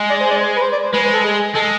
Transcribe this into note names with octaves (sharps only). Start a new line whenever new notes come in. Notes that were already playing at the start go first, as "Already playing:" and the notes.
Already playing: G#3
D5
C5
D5
C5
B4
C5
D5
C5
G#3 B4
B4
A4
G#4
G#3 A4